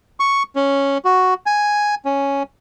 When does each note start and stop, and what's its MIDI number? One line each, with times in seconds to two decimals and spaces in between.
0.20 0.43 85
0.56 0.98 61
1.05 1.34 66
1.46 1.95 80
2.05 2.43 61